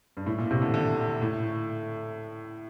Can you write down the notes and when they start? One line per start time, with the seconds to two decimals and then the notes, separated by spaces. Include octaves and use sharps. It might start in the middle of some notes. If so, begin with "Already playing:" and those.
0.17 G2
0.26 A2
0.38 A#2
0.51 C3
0.62 D3
0.74 D3
1.22 A2